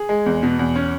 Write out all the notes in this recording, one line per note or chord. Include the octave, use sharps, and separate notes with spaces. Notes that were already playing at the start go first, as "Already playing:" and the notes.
Already playing: G#4
G#3
E2
B2
E2
C#4